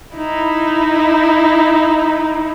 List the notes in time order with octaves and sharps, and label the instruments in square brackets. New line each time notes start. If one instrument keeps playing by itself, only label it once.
[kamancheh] D#4 E4